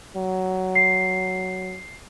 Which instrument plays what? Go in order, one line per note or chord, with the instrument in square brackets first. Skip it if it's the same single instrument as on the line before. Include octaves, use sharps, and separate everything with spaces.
[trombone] F#3
[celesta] C7